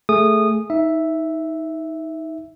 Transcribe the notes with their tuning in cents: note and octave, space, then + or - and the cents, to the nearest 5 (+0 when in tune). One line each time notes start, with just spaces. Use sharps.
A3 +0 G#4 +0 D#6 -15
D#4 +25 E5 +0